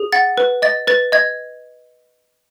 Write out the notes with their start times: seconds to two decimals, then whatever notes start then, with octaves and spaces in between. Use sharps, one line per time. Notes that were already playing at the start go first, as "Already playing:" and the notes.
Already playing: G#4
0.12 F#5 A6
0.38 B4
0.62 D#5 A6
0.87 B4 A6
1.12 D#5 G#6